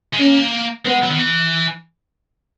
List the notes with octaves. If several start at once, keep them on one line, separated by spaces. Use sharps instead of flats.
G#3
A#3 C#4
G#3 B3
F#3
D#3
E3